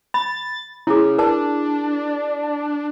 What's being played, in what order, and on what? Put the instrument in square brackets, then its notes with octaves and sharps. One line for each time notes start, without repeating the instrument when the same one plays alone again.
[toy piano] B5 [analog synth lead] A6
[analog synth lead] C#3 [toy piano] E4 G#4
[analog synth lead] D4 [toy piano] A#4 A5